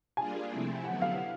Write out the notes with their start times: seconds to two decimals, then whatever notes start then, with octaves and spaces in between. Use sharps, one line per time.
0.17 G3 A#3 D4 F4 G#4 G#5
0.50 C3 F3 A3 C4 E4
0.84 D3 F#3 B3 E4 F#5
1.02 F5
1.13 F#5